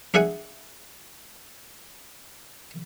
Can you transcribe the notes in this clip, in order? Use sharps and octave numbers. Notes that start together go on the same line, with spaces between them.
D4 G#4 E5 F#5 G#5